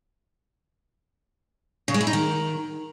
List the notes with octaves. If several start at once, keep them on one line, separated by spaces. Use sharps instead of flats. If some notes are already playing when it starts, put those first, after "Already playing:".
C#3
G#3
E4
D#4
D#3